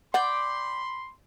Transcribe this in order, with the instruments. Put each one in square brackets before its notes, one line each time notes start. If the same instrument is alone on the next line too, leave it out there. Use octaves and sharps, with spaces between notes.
[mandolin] D5 G5 [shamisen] F#5 [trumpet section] B5 C6